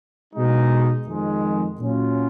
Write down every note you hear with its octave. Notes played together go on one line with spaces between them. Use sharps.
B2 G#3 D#4
F2 D#3 G#3
A#2 F#3 C#4 F4